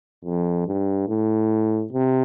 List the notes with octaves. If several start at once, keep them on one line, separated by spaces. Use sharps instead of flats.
F2
G2
A2
C3